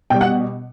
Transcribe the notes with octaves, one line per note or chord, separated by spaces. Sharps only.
B2 G3 G5
F#5